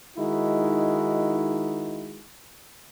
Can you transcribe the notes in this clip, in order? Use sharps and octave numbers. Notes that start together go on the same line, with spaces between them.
D#3 G#3 D#4 E4 F#4